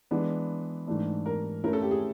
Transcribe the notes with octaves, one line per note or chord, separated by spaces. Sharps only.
E3 G#3 B3 D4
G#2 E3 A3 D4
A#4
A3 C#4 E4 A#4
A4
G4
G#4